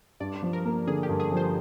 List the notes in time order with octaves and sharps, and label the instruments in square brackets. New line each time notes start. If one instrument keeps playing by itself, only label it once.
[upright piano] G2 [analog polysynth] D5
[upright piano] F3
[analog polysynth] A#4
[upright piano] A#3
[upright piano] D3 [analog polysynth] G#4
[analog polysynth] G4
[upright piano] G2
[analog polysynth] G#4
[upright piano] F3 [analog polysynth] C5